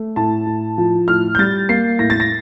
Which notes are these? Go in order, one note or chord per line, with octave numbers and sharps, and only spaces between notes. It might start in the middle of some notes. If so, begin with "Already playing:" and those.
Already playing: A3
A2 A5
A2
F3
A2 F6
G6
G3 A6
A#3 C7
A2 A#6
A6
A#6